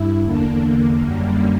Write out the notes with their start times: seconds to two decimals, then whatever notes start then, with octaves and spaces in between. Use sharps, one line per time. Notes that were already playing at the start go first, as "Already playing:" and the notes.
Already playing: G2 E4
0.23 E2 D3 A#3 D4
0.62 E2 D3 A#3
1.01 F#2 D3 G3 A#3